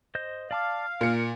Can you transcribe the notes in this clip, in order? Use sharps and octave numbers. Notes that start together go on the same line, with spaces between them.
C5 D#5 G6
D5 F5 A5 D6
A#2 A#4 C#7